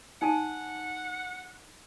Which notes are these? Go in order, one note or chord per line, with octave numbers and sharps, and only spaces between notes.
D#4 F#5 G#5 A5